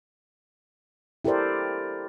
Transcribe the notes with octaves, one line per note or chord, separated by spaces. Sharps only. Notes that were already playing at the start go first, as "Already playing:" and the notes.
E4 G4 A4 A#4 C5 D5